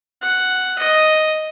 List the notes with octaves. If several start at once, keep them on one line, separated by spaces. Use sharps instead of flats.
F#5
D#5